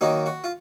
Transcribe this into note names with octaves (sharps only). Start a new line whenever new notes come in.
D#3 F#3 A#3 D#4 F#4
F#4
F4